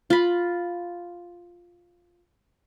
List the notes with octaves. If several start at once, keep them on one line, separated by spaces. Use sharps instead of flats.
F4 B5